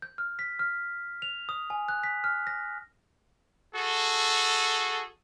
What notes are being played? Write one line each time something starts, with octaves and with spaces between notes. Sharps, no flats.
G6
F6
B6
F6
F7
D#6
G#5
F#6
B6
F6
A#6
F#4 G#4 A4